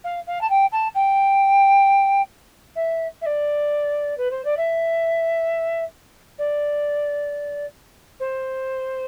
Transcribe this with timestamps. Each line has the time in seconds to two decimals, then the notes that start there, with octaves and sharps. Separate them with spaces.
0.04 F5
0.27 F5
0.41 A5
0.50 G5
0.72 A5
0.95 G5
2.76 E5
3.21 E5
3.26 D5
4.17 B4
4.31 C5
4.44 D5
4.57 E5
6.38 D5
8.20 C5